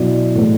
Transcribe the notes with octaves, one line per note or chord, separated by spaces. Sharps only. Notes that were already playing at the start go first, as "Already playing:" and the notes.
Already playing: B2 F#3 B3 E4 D5
A2 E3 G#3